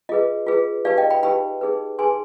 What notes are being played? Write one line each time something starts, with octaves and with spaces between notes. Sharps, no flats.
F4 G#4 B4 D#5
F4 G#4 B4
D#4 G4 B4 D5 F5
D#5 G5
G5 B5
D#4 G4 B4 G5 B5
D#4 G#4 B4
D#4 G#4 B4 G#5 C6